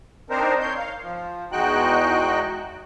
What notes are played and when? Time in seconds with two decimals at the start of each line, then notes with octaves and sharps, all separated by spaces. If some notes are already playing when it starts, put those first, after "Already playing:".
0.30 C4 D4 D#4 A#4 C5
0.61 C#5 C6 G6
0.78 F5
1.02 F3
1.52 E2 G#3 D#4 F#4 G5 F#6